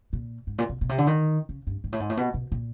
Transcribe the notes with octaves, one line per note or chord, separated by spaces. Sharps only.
A#2
G#2
A#2
B2
B2
C3
D3
D#3
C#3
G2
G#2
A2
G#2
A2
B2
B2
A#2